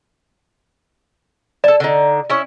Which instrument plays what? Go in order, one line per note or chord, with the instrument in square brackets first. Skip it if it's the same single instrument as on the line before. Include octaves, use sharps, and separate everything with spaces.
[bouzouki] A4 A5 [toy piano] D5
[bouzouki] D3 D#4
C#4 E4